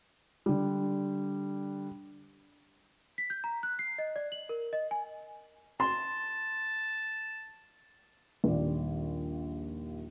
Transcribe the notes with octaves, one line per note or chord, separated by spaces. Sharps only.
D3 G3
B6
G6
A#5
F#6
C7
D#5
D5
F#7
A#4
D#5
G#5
A5 C6
A#1 D#2 G3 D5